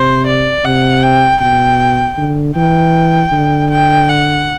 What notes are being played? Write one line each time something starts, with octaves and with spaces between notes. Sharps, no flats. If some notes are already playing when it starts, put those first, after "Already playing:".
Already playing: C3 C5
D5
C3 F#5
G5
B2 G5
D3
E3 G5
D3
G5
F#5